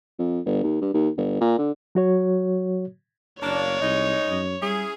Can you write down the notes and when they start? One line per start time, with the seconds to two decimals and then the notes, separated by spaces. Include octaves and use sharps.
0.19 F2
0.46 G1
0.63 D#2
0.81 G2
0.94 D#2
1.17 G1
1.41 A#2
1.58 D3
1.95 F#3 F#4 C#5
3.42 F#1 A#3 D4 C#5
3.81 C2 G#3 D#4
4.29 F#2
4.62 G3 C#4 E4 G#4